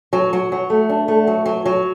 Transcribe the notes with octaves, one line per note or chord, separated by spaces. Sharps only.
F#3
F#3
F#3
A3
D4
A3
F#3
F#3
F#3